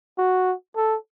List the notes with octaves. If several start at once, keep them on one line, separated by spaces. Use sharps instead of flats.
F#4
A4